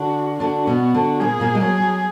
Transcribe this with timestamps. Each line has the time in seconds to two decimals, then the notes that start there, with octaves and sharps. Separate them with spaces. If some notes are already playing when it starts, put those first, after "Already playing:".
Already playing: D3 D4 F#4
0.40 D3 D4 F#4
0.67 B2 B3
0.94 D3 D4
1.20 A#2 A#3 G#4
1.40 A#2 A#3
1.55 G#3
1.61 F#3 G#4
1.80 F#3